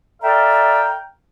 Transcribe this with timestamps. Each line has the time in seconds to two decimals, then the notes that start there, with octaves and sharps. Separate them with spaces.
0.22 A4 D5 E5 F5 G5 A#5